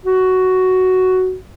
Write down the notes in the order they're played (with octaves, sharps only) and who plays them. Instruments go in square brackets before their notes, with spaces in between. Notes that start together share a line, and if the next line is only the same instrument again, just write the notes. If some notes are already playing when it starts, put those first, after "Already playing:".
[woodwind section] F#4